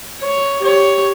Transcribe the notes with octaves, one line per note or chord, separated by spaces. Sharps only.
C#5
G4 C#5